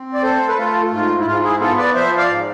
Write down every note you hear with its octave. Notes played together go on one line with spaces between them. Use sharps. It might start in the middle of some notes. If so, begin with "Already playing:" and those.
Already playing: C4
D5
A3 A4 C5
B4
A3 F4 A4
G#2 F4
E4
G#2 F4
E4 G#4
B3 F4 A4
B4 D5
F3 C5 E5
D5 F5
G#2